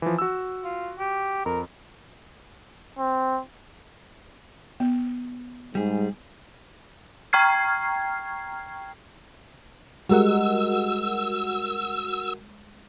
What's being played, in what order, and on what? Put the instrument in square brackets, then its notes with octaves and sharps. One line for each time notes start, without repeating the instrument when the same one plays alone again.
[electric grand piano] E3 F3
F#4 E6
[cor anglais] F4
G4
[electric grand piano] F2 [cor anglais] A#4
[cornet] C4
[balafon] B3
[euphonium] G#2 [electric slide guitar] G3 G#4
[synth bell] G5 A#5 C#6 F6 G#6 C7
[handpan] G3 G#3 [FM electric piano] F#4 A#4 F#5 [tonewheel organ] E6